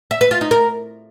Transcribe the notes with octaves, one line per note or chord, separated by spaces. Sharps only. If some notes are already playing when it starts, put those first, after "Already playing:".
E5
B4
F4
D#4
A#4